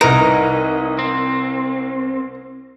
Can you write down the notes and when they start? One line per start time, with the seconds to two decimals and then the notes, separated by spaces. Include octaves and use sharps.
0.01 C2 D#4 E4 A#4 B4
0.99 C4